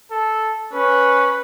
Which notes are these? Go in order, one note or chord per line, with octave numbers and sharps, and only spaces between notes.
A4
C#4 B4